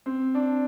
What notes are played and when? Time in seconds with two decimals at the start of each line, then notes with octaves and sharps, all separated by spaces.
0.06 C4
0.34 D4